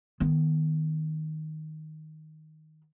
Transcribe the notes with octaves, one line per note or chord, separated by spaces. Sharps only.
D#3 B3